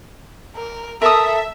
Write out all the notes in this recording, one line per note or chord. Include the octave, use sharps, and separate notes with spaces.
A#4
A4 A#4 E5 A5 D#6